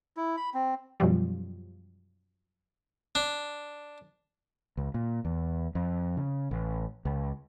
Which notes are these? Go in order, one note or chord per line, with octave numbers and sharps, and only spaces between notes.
E4
B5
C4
F#2 B2 F3 G3
D4
C#2
A#2
E2
F2
C#3
A1
C#2